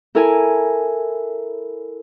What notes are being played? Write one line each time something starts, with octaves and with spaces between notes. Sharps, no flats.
E4 A4 A#4 G#5